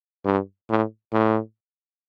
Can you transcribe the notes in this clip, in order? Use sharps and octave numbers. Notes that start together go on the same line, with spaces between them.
G2
A2
A2